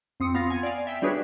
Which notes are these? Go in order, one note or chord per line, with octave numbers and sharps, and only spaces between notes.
F2 C4 D#6 C#7
B3 F4 F5 A#6 C7
G#5 G#6
D5 F5
E5 G5 B6
G3 D4 F#4 G#4 B4 C#5